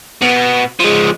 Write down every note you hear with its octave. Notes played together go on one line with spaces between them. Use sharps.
B2 B3
F3 G#3